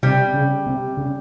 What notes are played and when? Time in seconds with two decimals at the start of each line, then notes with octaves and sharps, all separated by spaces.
0.03 C3 G3
0.34 C#3
0.67 C3
0.97 C#3